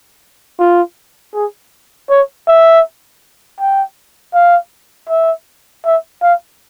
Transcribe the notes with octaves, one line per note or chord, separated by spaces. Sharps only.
F4
G#4
C#5
E5
G5
F5
E5
E5
F5